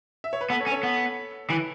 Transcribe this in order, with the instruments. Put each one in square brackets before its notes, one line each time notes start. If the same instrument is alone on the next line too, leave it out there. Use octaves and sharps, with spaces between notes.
[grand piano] E5
C#5
B4
[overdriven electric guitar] B3 [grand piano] A4
[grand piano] A4 C#5
[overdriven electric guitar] C#4
[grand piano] A4 C#5
[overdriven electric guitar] B3
[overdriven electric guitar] E3 [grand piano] B4